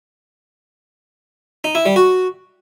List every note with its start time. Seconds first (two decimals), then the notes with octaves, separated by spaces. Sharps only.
1.64 D#4
1.75 E4
1.86 G3
1.96 F#4